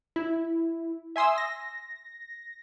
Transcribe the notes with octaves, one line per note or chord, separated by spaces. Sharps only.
E4
E5 G#5 C6 D#6 E6
A#6